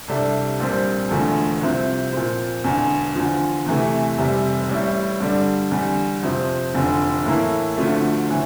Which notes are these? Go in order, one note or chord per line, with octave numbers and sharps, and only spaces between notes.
C2 C3 G3 D4 A4
A#1 A#2 G3 C4
E1 E2 D3 F3 A3
C2 C3 F3 C4
A#2 F3 C4
E1 E2 D3
E2 D3 F3
E2 C3 E3 A3
F1 E2 C3 G3
A1 A2 G3
G2 D3 G3 D4 A4
E2 D3 G3
F2 C3 F3 C4
F1 E2 D3 F3
A2 E3 A#3 E4 A4
D2 D3 F3 A3
A2 E3